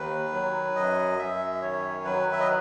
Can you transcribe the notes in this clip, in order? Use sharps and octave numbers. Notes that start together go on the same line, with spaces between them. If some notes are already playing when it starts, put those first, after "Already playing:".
Already playing: D#2 D#3 B4
F#3
F#2 D#5
F#2 E5
D#3 C#5
F#3 B4
E5
D#5